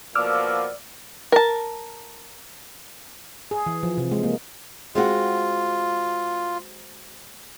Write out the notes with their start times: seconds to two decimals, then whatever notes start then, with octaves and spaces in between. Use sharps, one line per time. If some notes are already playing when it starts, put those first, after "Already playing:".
0.15 B2 F3 A#3 D5 D6 E6 F6
1.32 A#4 A5
3.51 G#4
3.66 E3
3.83 F3
3.98 C3
4.12 G#3
4.23 A#3
4.95 G#3 C4 F4 F#4